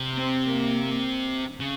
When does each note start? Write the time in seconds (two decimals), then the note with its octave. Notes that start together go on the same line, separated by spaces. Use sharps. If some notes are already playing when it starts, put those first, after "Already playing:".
Already playing: C3
0.16 C4
0.45 A#3
1.60 C#3